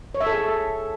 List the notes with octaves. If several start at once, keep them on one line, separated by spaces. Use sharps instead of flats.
C#5
E5
A4
G#4